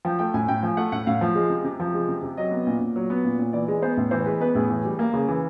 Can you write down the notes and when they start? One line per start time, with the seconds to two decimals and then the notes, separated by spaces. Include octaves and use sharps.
0.05 F3 G5
0.19 A3 G5
0.34 A2 G#5
0.48 A2 G5
0.63 F3 G#5
0.77 A3 F#5
0.92 A2 F#5
1.07 A2 F5
1.21 F3
1.35 G#3
1.50 C3
1.65 C3
1.80 F3
1.94 G#3
2.09 C3
2.23 C3
2.37 F#3 D#5
2.52 B3
2.67 A#2
2.81 A#2
2.96 F#3
3.10 B3
3.25 A#2
3.39 A#2
3.53 E3 D5
3.68 G#3
3.82 B3 C5
3.97 A2
4.11 E3 C5
4.26 G#3 B4
4.41 B3 B4
4.55 A2 G#4
4.70 E3
4.85 G3
4.99 A#3
5.13 C#3
5.28 E3